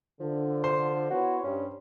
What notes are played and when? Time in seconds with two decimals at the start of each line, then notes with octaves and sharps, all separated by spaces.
0.20 D3 F3
0.64 C5
1.10 B3 E4 F#4 C#5
1.43 G2 C#4